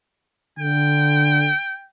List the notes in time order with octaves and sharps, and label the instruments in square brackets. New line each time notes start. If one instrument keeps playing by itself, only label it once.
[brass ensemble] D3 [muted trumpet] G5